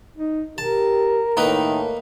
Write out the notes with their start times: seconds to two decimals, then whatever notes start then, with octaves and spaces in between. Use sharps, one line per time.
0.17 D#4
0.58 G4 A#4 A5
1.37 A2 D#3 A#3 D#4 B4